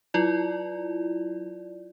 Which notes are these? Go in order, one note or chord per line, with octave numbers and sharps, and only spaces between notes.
F#3 E4 F4 D5